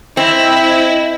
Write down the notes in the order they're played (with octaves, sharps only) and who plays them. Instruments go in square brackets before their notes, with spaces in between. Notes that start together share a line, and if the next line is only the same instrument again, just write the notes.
[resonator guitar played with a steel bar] C4 [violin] E4 [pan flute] D#5